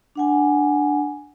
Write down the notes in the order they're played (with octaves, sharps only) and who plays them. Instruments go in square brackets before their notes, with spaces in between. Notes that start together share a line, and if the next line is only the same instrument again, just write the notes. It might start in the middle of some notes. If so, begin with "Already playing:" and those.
[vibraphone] D4 F#5 G#5